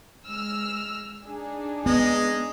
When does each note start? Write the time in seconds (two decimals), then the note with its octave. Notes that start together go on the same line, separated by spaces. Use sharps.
0.24 G#3 E6 F6
1.25 D4 D#4 G#4
1.86 G#3 B3 D#5